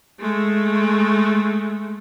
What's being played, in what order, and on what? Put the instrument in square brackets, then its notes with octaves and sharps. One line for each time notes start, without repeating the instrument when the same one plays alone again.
[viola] G#3 A3